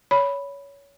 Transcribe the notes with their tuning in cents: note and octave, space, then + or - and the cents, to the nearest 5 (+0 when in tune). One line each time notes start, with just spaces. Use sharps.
C#5 +20 B5 +0